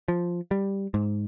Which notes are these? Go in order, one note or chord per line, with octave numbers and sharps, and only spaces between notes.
F3
G3
G#2